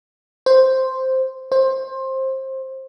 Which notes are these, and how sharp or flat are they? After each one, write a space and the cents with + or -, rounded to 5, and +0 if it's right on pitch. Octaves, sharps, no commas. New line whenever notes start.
C5 +0
C5 +20